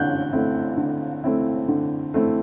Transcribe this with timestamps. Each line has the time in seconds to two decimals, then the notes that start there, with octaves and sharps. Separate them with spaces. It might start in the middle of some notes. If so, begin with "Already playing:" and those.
Already playing: D3 C4 E4 F#6 G6
0.33 A3 C4 E4
0.77 D3
1.24 A3 C4 E4
1.68 D3
2.14 A3 C4 E4